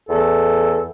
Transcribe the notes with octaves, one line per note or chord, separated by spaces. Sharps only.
E2 A4